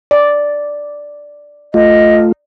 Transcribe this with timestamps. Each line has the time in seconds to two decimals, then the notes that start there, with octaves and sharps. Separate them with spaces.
0.11 D5
1.74 A3 F4 D#5